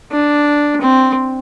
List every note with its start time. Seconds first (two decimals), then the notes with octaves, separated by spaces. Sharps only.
0.12 D4
0.81 C4